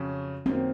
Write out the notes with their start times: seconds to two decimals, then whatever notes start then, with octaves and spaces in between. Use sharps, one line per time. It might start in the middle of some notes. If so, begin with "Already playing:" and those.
Already playing: F2 C#3 F#3 C#4
0.46 F#2 D#3 F#3 A#3 C4